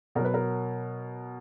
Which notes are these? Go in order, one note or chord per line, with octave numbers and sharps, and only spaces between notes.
B2 F#3 A#4 B4
A#4